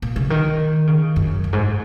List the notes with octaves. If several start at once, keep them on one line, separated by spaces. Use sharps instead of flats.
A#2
C#3
D#3
C#3
F#2
F#2
G#2